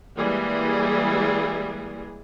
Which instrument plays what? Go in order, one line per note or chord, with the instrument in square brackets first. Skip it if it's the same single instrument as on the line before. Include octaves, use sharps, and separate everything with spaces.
[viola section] E3 G3 G#3 A#3 G#4